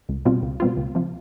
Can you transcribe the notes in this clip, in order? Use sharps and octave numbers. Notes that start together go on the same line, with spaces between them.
C#2
B2 G3 C4 F4
C#2
B2 G3 C4 F4
C#2
C3 F3